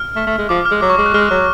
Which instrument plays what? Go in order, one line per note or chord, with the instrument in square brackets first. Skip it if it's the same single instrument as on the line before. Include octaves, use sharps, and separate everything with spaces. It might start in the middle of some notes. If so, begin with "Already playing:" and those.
Already playing: [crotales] F6
[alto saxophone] A3
A3
G#3
[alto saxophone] F3 [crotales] D6
[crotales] F6
[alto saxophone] G#3
[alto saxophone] F#3 [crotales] D6
[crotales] C#6
[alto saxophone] G#3 [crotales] D6
[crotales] F#6
[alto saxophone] G#3 [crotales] F6
[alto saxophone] F#3